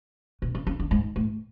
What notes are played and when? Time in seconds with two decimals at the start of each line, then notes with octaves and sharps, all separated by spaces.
0.42 B2
0.55 C#3
0.67 C#3
0.80 D3
0.91 G#2
1.16 A2